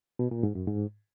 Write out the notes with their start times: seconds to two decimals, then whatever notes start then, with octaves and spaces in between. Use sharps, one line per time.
0.19 B2
0.31 A#2
0.43 G#2
0.55 F#2
0.67 G#2